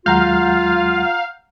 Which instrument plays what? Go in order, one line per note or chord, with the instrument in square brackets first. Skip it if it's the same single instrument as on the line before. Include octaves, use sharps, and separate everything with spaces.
[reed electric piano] D#2 F#3 G#3 [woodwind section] F4 [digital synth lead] F5 [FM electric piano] F#5 A#5 G6